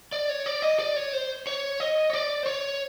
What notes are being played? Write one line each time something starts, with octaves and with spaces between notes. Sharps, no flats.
D5
C#5
D5
D#5
D5
C#5
C5
C#5
D#5
C#5
D5
C5
C#5